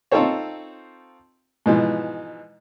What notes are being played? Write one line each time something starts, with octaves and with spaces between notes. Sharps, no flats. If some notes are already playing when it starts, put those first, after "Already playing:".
C4 D#4 F4 A4 C5 C#5
G#2 B2 E3 F3